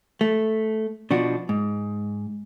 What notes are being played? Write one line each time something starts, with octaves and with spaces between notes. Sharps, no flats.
A3
B2 F3 D4 F#4
G#2